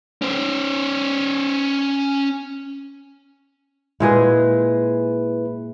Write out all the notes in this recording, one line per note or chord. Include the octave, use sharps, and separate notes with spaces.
C#4 C5
A#2 G#3 E4 G#4 B4